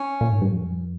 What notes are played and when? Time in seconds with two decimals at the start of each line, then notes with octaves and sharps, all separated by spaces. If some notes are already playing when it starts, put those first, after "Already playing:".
Already playing: C#4
0.21 A#2
0.32 G#2
0.41 G2
0.52 F2